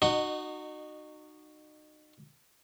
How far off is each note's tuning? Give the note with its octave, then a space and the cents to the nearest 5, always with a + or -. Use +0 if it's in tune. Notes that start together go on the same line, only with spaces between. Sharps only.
D#4 -35 F#4 +0 D#5 -15